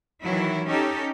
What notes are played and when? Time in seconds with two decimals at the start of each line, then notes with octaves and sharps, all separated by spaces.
0.22 D#3 E3 F#3 E4
0.68 C#4 D#4 G4 A4